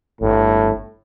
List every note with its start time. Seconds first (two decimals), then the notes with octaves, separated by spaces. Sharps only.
0.21 G1 A2